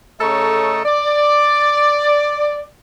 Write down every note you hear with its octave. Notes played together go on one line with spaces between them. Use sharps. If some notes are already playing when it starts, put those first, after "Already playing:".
C#3 A3 A4 C#5 D#5 A#5
D5